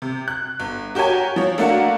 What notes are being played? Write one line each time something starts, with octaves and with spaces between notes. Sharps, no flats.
C3
F#6
G1
F#4 G4 A#4 C#5 G#5
F3 C#5
A3 A#3 D4 F#4 F5 F#5